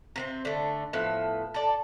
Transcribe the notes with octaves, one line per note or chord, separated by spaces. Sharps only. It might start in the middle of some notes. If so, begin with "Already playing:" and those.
C3 B3 C4
D3 A3
A2 F3 B3 E5
A4 D5